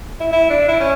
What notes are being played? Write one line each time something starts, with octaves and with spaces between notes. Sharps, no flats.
E4
E4
D4
E4
C#4